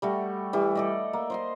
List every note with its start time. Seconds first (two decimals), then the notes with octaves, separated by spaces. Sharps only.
0.02 G3 A3 F#4
0.53 E3 G3
0.75 A4 D5 D#5
1.13 A#3
1.30 C5 D#5 C6